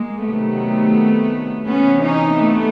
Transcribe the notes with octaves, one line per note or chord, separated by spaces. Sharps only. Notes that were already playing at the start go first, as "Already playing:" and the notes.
Already playing: G#3 A#3
C3 D#3 F#3 A3 B3
C3 E3 B3 C#4
C#4 D#4
A3 B3